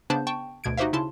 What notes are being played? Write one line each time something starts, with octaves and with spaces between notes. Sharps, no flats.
C#3 B3 D4 C5 A5 G6
G5 A5 C#6
D2 B2 G#6 D7
D#4 F#4 G4 C5 E5 F5
C#3 E4 A5 C6